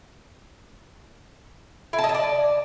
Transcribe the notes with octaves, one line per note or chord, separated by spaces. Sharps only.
E4
A5
D#5
A5
D5